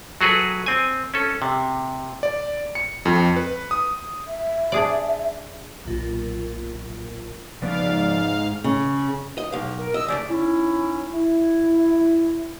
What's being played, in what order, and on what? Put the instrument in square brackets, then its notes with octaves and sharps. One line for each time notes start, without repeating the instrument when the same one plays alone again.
[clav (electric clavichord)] F#3 F#4 G#4 A4 B4
C4 G#5
C#4 A4
C3
[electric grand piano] D5
C#7
F2
B4
D#6
[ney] E5
[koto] D4 G#4 D5
[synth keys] B1 A#2
[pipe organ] G#2 F5 [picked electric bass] C#3 F3 B3 [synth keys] B4 D5
[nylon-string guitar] C#3
[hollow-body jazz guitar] D#5
B1 F5
[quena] A#4
[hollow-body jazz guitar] D#5 [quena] E6
[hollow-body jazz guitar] C#3 F#3 A3 [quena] D5
[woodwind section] C#4 D#4 E4
E4